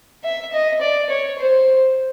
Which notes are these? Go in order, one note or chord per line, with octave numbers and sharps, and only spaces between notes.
E5
D#5
D5
C#5
C5